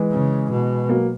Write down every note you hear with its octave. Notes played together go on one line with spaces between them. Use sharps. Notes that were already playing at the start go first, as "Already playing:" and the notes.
Already playing: E3 G#3
C#3
B2
F#3 A#3